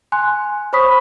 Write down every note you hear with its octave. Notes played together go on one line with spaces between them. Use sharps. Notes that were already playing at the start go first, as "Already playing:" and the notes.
G#5 C6 F#6
C5 C#5 B5 C#6 D#6 B6